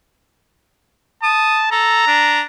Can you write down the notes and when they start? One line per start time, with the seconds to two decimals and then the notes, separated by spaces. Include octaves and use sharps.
1.23 A5 D#6
1.71 A4 A#5
2.07 D4